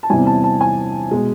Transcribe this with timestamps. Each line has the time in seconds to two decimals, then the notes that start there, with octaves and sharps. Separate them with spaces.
0.03 A5
0.10 E2 C3 E3 G3 G#5
0.27 A5
0.44 A5
0.61 G#5
1.11 B2 G#3